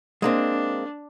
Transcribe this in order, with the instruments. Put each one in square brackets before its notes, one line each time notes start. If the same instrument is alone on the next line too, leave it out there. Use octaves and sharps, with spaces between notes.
[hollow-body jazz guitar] G#3 A#3 C4 [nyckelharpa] D4